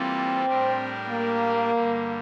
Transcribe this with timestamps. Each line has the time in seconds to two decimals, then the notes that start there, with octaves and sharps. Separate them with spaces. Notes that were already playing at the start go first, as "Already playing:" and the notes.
Already playing: E3 G3 A#3 C4 F4 A4
0.45 A2 G3 D4 G4 A#4
1.08 A#3
1.72 G2 D3 G3